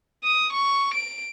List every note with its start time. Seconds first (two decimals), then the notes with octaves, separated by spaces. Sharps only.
0.24 D#6
0.53 C#6
0.95 D7